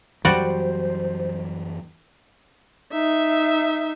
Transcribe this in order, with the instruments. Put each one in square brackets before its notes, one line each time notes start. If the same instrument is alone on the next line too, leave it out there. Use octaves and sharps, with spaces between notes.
[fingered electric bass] F#2 E3 F#3 [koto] G3 F#4 D5 [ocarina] C5
[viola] D#4 E5